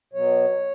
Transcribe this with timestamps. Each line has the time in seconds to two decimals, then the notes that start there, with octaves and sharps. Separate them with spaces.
0.13 B2 F#3 B3 C#5